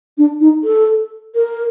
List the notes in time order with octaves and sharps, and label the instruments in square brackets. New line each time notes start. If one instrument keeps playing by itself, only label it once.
[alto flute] D4
D#4
A4
A#4